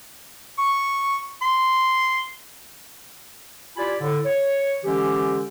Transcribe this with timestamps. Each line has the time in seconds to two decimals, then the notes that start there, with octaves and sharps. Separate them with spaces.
0.59 C#6
1.42 C6
3.77 E4 F4 G4 D5 G#5 B5
3.99 A2 D3
4.25 C#5
4.84 D3 E3 G#3 C#4 G4